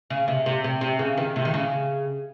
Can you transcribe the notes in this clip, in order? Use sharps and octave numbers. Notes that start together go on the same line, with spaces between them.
C#3
C3
C3
C3
C3
C#3
D#3
C3
D#3
C#3